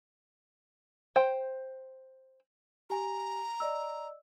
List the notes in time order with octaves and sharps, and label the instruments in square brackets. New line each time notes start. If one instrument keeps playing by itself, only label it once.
[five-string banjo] C5 G5
[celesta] G4 G#5 [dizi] A#5
[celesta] D5 D#5 E6